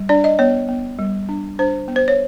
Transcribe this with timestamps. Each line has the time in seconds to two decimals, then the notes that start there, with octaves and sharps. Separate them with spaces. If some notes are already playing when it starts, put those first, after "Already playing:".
Already playing: G3
0.09 D4 D5
0.24 D#5
0.39 B3 C#5
0.69 B3
0.99 G3
1.29 D4
1.59 D4 C5
1.88 B3
1.96 C5
2.08 C#5